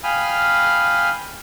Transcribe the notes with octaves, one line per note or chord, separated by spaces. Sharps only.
F5 G5 G#5 B5 D#6 F6